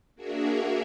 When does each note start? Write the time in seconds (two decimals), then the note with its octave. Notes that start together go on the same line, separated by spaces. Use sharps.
0.15 A#3 D4 F#4 G#4 A#4 E5